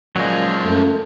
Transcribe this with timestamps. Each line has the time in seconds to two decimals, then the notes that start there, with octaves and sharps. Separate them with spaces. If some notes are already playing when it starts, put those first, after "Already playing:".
0.16 C#2 A#2 F3 F#3 G#3
0.64 F#2 A3